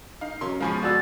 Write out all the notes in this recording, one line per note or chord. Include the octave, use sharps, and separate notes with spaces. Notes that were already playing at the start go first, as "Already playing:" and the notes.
D#4 F5
F#3 C#4 A#4 C6
B2 F3 G#3 F5 G#5 B5 C#6
F#4 D5 E6 A6